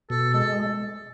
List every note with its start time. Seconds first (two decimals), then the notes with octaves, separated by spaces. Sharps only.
0.10 B2 A4
0.34 G#3 A4